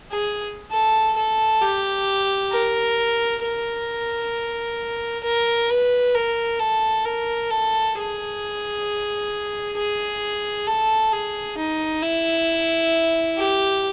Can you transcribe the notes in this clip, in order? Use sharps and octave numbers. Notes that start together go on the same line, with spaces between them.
G#4
A4
A4
G4
A#4
A#4
A#4
B4
A#4
A4
A#4
A4
G#4
G#4
A4
G#4
D#4
E4
G4